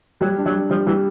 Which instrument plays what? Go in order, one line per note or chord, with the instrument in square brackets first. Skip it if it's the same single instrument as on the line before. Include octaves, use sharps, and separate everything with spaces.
[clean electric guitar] F#3 [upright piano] G3
[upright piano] D4
[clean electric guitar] F#3
[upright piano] G3
[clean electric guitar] F3 [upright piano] G3
[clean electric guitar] E3 [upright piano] G3